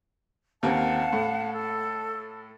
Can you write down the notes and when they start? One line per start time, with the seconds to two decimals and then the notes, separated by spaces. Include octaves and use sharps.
0.63 D#2 A#3 C4 F5 F#5 A5
1.13 A2
1.53 A4